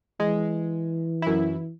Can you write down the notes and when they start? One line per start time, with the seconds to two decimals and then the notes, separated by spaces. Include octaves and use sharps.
0.20 E3 G#3
1.22 F#2 E4